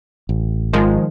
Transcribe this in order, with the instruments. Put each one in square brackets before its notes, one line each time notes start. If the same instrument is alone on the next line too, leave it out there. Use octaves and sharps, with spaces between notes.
[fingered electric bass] A1
[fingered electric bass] G#1 [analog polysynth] D#3 F3 G#3